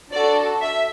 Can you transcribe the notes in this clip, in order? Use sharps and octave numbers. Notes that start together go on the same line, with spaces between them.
D4 F#4 A4 D5
E5